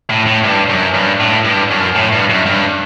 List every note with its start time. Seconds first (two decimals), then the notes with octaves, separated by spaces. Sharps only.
0.10 A2
0.26 A2
0.44 G2
0.69 F#2
0.94 G2
1.20 A2
1.45 G2
1.71 F#2
1.95 A2
2.13 G2
2.30 F#2
2.46 G2